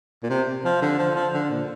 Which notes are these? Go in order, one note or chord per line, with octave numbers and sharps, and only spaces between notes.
A#2
C3
F3
D3
F3
F3
D3
A#2